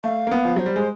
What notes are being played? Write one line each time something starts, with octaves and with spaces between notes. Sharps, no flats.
A3 F5
A#3
B3
F3
F#3 C5
G3
G#3